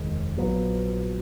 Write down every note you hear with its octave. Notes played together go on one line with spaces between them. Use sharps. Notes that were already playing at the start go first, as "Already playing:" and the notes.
Already playing: F1 D#2 D#3 G#3
A#1 A#2 F#3 B3